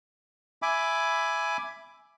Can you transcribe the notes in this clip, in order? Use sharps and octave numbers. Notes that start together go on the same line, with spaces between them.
E5 G#5 B5 D6